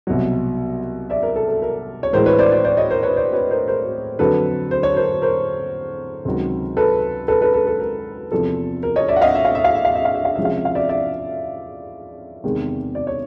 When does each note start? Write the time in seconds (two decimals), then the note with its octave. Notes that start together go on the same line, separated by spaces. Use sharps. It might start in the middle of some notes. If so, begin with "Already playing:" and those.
0.07 C2 B2 F#3
1.10 D5 E5
1.23 A#4
1.36 A4
1.48 A4
1.62 A#4
2.03 C#5
2.13 A2 E3 G#3 A#4 C5
2.26 B4 C#5
2.39 C5 D5
2.52 C5 D5
2.64 C5 D5
2.77 C#5 D#5
2.90 A#4 C5
3.03 B4 C#5
3.16 C5 D5
3.33 B4 C#5
3.51 A#4 C5
3.68 A#4 C5
4.19 F2 D3 F#3 A4 B4
4.71 C5
4.83 C#5
4.97 A#4 C5
5.22 A#4 C5
6.25 C#2 C3 D#3 F#3
6.77 A4 B4
7.28 A4 B4
7.41 A4 B4
7.54 A4
7.67 A4
7.80 A#4
8.32 E2 C3 F3 A4
8.83 A#4
8.96 C#5 D#5
9.08 D5 E5
9.16 F#5
9.21 D#5 F5
9.35 E5
9.45 F5
9.55 E5
9.64 F5
9.75 E5
9.85 F5
9.95 E5
10.05 F5
10.15 E5
10.25 F5
10.35 C3 F3 G#3 C#4 E5
10.45 F5
10.55 E5
10.65 F5
10.75 D5 E5
10.89 D5 E5
12.44 E2 C3 D#3 G#3
12.95 D5
13.07 C#5